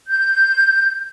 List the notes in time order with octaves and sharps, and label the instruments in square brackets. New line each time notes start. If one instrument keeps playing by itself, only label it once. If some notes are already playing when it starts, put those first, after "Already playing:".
[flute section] G6